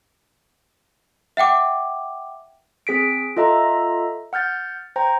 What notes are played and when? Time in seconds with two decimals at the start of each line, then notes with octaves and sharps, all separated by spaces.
1.37 E5 F#5 G5 D6
2.87 C4 G#4 B6 D7
3.37 F4 A4 D#5 E5 A#5
4.33 F#5 F6 G6 A6
4.96 C5 G5 A#5